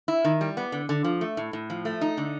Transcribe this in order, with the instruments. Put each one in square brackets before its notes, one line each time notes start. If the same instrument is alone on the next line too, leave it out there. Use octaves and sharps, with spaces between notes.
[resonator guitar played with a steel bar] E4
D#3
G3
B3
D3
D3
F3
A3
A2
A2
F3
A3
D#4
D3